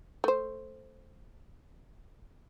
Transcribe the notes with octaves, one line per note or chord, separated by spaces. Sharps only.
A3 C5